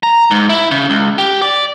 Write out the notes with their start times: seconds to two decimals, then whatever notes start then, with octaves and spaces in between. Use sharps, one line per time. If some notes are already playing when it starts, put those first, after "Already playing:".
0.03 A#5
0.31 G#2
0.49 E4
0.71 C#3
0.90 C#2
1.18 G4
1.42 D5